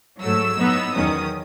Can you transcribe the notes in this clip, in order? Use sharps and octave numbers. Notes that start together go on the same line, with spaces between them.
G#2 F#3 A3 E6
A2 F#3 B3 D#4
E2 D#3 F#3 C#4 D#6